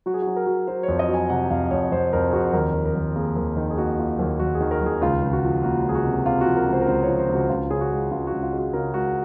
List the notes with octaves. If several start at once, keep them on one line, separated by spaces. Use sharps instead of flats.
F#3 F#4
G#4
F#4
F#3
A#4
F#3
F#3 C5
C#5
F2
D#5
F#3
G#5
C3 F#5
F2 F5
F2 C#5
F2 C5
F2 A#4
G#4
F2 F#4
D#2 A#4
D#2
A#4
D#2
A#3 G#4
D#2
D#3
G#4
A#3 F#4
A#3 F4
D#2
D#2 F#4
G#4
D#3
A#4
D#2 G#4
C#2 F4
C#2
F#4
F3
A#3 F#4
C#2 G#4
F#4
C3
C3 F4
F#4
F3
A#4
C#2
C5
A#4
C#2 C5
C#5
F3
C5
C#2
F#4
C#2 F4
C#3 G#4
F#4
G#3
C#2 F4
F#4
C#2
F4
G#3
F#4
C#3 A#4
G#3 F#4